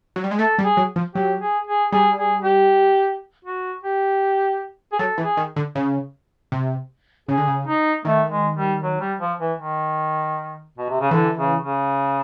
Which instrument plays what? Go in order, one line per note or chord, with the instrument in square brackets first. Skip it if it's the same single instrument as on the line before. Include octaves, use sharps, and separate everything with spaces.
[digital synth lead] F#3
G3
G#3
[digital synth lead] A3 [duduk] A4
[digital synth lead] G3
[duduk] G#4
[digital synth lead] F#3
F3
[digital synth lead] F#3 [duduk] G4
[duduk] G#4
G#4
[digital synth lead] G3 [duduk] G#4
[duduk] G#4
G4
F#4
G4
G#4
[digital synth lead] F#3 [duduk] A4
[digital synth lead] E3
[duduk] G#4
[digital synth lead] D#3
D3
C#3
C3
[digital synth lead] C#3 [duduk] G#4
[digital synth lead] D3
C#3
[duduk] D#4
[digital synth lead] D#3 [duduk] A3
[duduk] G#3
G3
F#3
G3
F3
E3
D#3
B2
C3
C#3
[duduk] D3 [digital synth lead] E3
[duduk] C#3
C#3